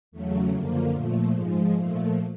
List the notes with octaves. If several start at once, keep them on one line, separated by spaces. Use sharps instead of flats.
E2 C#3 F#3 A3
F#2 D3 F3 A#3
A#2 F3 A3
G#2 F3 G#3
A#2 F3 A3